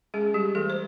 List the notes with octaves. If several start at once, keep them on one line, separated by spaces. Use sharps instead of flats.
G#3 C#4 G#4
G3 G4
E3 A3 A4
C5